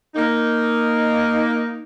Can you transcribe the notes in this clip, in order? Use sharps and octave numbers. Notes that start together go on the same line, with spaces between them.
A#3 D#4